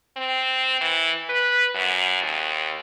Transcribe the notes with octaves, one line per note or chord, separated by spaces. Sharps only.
C4
E3
B4
F#2
D#2